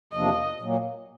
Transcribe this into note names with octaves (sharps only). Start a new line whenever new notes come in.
E2 C3 F3 A#3 D4 D#5
A#2 F#3 A#3